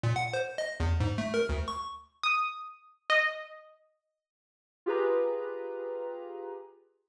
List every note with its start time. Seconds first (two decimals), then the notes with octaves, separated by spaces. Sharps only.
0.03 A#2
0.16 F#5
0.33 C5
0.58 D#5
0.80 E2
1.00 G#2
1.18 A3
1.34 A#4
1.49 D2
1.68 C#6
2.23 D#6
3.10 D#5
4.86 F4 G4 G#4 B4 A#5